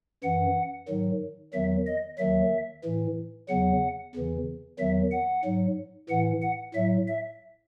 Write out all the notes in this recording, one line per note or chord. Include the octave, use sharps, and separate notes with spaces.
F#2 E3 F#5
G#2 D#3 F#3
E2 D#3 F#3 E5
D#5
D#2 D#3 F#3 E5
A2 E3
E2 C#3 F#3 F#5
E2 C#3 E3
E2 D#3 F#3 E5
F#5
G#2 F#3
A2 E3 F#5
F#5
A2 F#3 E5
E5